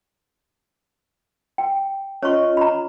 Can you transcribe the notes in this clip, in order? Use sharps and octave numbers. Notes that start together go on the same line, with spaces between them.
G5
C#4 F4 C#5 D#5 C#6
A#5 B5